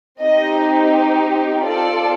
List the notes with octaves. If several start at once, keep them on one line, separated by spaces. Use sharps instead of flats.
C4 D#4 G4 D#5
C4 F4 A4 D5